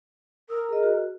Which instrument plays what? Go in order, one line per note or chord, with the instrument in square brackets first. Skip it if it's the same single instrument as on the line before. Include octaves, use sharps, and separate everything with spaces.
[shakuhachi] A#4 [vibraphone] D#6 E6
[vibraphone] G#4 D#5
F#4